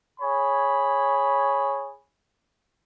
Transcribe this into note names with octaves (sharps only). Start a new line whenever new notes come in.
G#4 C#5 B5